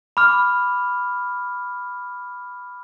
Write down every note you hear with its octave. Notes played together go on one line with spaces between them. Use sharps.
B5 D6 F6